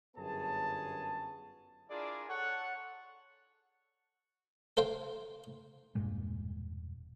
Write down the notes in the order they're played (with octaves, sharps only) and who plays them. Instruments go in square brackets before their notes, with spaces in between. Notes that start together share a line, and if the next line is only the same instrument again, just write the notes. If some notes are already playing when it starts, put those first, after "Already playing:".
[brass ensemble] G1 F#2 B3 G#4 C#5 A5
[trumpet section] D4 E4 F4 G#4 A#4 D5
A4 C#5 F#5
[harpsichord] A4 C5 F5 G5
[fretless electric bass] E1 G2 A#2 G#3